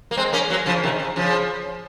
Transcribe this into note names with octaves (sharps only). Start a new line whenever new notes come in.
A#3
G#3 C4
A#3 C#4
F#3 A#3
C#3 F3
C3 D#3
C#3
C#3 F3